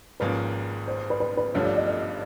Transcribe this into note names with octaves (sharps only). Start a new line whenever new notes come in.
G#1 G#2 F3 A#3 C#4 B4
C5
B4
B4
B4
G1 G2 D3 F3 A3 C#5
D5
D#5
D#5